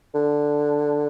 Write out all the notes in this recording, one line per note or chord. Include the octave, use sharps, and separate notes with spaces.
D3